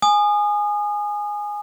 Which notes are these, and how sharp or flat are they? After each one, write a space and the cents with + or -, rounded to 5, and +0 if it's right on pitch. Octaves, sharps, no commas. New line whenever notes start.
G#5 +0 D#6 -30